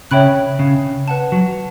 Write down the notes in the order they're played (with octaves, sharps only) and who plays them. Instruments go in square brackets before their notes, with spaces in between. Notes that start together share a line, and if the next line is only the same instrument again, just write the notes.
[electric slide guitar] C#3 [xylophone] C#5 E5 G5 B5 F#6
[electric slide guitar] C#3
[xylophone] B4 F#5 A5
[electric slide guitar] F#3